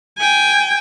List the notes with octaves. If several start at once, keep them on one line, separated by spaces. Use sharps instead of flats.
G5 G#5